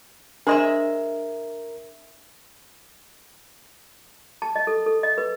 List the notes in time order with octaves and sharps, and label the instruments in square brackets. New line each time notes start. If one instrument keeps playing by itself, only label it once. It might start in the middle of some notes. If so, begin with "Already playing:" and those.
[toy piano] D4 C5 C6 [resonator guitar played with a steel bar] G#4 D#5 E5 [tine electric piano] A#4
[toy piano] A5
D#5
A4
A4
D#5
B4